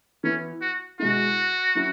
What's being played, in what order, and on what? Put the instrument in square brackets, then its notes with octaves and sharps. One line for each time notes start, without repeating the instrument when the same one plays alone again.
[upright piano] E3 B3 E4 [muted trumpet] C#4
[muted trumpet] F#4
[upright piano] B2 G#3 E4 [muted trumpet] F#4
[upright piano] F#3 C#4 E4